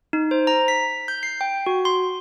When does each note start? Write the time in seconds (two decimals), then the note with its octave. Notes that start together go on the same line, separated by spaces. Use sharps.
0.13 D#4
0.31 C5
0.47 A#5
0.68 B6
1.08 G6
1.23 C7
1.41 G5
1.66 F#4
1.85 C6